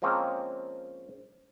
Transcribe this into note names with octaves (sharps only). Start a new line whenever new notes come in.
F3 G#3 A#3 C4 C#4